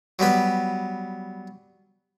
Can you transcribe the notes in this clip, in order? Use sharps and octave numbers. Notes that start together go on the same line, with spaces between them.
F#3 G3 B3 B4